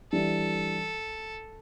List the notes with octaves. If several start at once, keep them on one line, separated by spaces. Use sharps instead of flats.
E3 G3 D4 A4